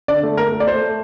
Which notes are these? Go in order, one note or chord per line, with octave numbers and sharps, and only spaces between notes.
D3 D5
A3
A3 A#4
A3
D5
A3 C5
A3